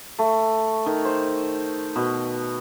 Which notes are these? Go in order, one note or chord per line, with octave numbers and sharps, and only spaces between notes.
A3
D#3
C5
B2